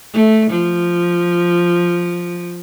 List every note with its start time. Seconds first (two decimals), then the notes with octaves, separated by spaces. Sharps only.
0.13 A3
0.51 F3